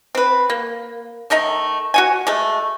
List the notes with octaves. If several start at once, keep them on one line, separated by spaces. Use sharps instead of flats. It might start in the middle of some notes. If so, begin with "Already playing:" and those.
C4 B4
A#3
D#3 A3 D#5 A#5
F#4 F#5 G#5
G#3 A3